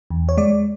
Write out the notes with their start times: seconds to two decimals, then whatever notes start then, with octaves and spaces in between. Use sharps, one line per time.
0.10 E2
0.29 C#5
0.37 G#3 D5